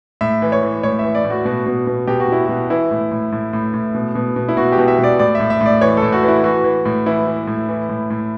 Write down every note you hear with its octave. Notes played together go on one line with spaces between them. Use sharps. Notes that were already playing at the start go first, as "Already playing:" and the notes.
A2 E5
E3
C#5
E3
A2 C#5
E5
E3
D5
A2
F#4
B2 F#4
B2
B2
B2 G4
F#4
B2 E4
B2 F#4
E3 E4
A2
A2
A2
A2
A2
B2
B2
B2
E4
B2 F#4
G4
B2
E5
B2
D5
A2 D5
A2 E5
E5
A2
D5
E3 C#5
A2 A4
F#4
E3
E4
E3 F#4
E3
A2
E3 E4
E3
A2
E3
A2
A2